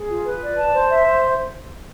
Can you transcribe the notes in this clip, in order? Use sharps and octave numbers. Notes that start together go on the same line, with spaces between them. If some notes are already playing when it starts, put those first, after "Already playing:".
Already playing: G#4
F4
B4
D5
A5
C5
E5
C5